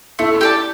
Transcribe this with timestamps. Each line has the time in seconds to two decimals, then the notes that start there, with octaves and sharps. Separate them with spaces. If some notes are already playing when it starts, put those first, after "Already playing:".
0.19 A3 E4
0.41 G4 D5 A5